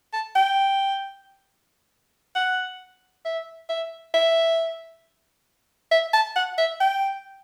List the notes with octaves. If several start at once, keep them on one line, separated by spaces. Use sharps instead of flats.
A5
G5
F#5
E5
E5
E5
E5
A5
F#5
E5
G5